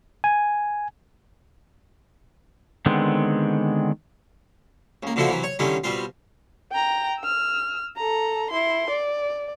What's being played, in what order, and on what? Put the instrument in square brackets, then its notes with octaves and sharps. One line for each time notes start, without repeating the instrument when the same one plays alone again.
[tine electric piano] G#5
[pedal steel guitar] D3 D#3 G#3 B3 C4
[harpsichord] C#2 A#3
B2 D3 F3 A3 E4 F#4
C3 E3 F#3
C#5
D3 D#3 G3 C#4 E4
B2 G3 C4 F4
[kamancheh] G5 A#5
E6 F6
A4 A#5
E4 C6
D5